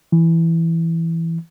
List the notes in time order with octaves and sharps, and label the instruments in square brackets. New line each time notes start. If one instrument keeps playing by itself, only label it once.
[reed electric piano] E3